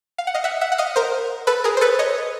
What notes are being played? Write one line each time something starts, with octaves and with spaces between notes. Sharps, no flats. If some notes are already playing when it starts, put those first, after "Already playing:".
F5
F#5
D#5 F5
E5 F#5
E5 F#5
F#5
D#5 F5
A#4 C5
A4 B4
G#4 A#4
C5
A4 B4
C#5 D#5